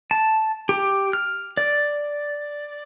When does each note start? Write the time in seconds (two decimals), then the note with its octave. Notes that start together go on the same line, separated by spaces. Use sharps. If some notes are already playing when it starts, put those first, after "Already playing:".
0.11 A5
0.69 G4
1.13 F6
1.57 D5